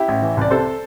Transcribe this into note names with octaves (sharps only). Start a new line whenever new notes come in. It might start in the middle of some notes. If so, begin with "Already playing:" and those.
Already playing: E4 G4
A1
E3
C2 D5
C3 A4 C5